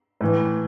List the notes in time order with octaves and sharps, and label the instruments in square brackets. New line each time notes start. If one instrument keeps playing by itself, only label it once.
[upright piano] A2 E3